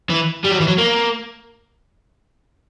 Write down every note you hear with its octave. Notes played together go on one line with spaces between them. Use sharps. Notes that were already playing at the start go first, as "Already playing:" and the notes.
E3
G3
F#3
E3
F#3
A#3